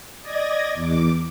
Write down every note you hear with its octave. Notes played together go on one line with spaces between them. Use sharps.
D5 D#5 G#6 A#6
E2 D6